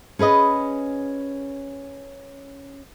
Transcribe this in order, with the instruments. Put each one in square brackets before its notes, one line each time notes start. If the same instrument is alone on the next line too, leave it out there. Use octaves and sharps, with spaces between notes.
[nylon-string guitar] C#4 G#4 B4 D#5